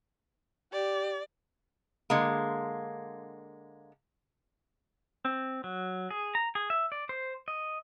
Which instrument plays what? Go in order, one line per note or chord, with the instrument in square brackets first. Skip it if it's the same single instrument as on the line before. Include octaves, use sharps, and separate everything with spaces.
[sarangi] G4 [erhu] D5
[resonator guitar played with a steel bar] D3 G#3 A#3
[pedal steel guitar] C4
F#3
G#4
A#5
G#4
E5
D5
C5
D#5